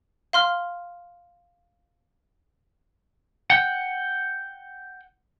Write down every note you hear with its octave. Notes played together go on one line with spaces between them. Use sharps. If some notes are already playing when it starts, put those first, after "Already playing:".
F5 C6 F6
F#5 G5